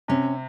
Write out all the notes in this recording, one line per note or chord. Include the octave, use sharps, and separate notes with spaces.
C3 C#4